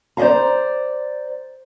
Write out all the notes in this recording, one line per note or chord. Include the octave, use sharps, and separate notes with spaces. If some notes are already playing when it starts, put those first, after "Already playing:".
C5 D5 D#5 F5 A#5